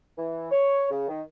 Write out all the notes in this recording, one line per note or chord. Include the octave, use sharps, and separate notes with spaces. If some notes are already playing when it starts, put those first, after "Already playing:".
E3
C#5
C#3
D#3